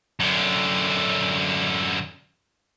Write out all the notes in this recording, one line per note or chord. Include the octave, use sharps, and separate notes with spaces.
F#2 D3